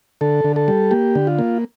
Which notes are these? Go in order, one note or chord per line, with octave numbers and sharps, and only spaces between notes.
D3 A4
D3
A4
G3
A#3 G4
D3
F4
A#3